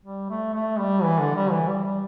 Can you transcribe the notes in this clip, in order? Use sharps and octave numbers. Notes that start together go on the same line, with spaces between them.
G3
A3
A3
G3
E3
D3
G3
E3
G3
G3